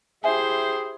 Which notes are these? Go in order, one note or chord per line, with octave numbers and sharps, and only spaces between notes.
E4 G4 G#4 C5 E5 G#5